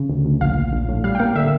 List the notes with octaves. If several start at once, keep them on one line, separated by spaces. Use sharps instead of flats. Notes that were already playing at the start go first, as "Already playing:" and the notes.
Already playing: C#3
D2
D2
A#1 F5
A#1
A#1
A2
G3 F5
G5
A#3 F5
D3 E5